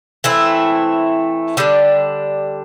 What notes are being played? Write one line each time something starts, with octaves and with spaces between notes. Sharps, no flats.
E3 A3 C4 E4
D3 G3 D4